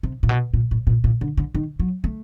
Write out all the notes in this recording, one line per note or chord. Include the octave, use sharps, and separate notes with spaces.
C3
A#2
B2
A#2
A2
A#2
A#2
D3
D3
D#3
F#3
A3